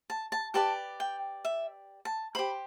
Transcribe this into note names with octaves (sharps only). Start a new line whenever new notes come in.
A5
A5
G4 B4 D5 A5
G5
E5
A5
G4 C5 B5